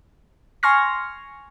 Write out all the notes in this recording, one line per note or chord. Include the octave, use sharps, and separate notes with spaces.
G#5 C6 C#6 F6 A#6